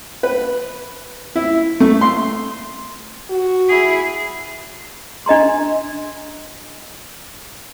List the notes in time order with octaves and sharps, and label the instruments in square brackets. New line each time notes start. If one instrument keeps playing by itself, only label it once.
[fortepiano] B4
E4
A3
C6
[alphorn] F#4
[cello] E4 G#4
[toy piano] D4 D#5 A#5 C6